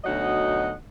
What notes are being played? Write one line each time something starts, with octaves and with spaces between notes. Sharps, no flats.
D2 B2 F#3 D#4 D#5 F#5